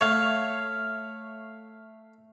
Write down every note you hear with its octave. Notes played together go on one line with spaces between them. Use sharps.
A3 C#5 F5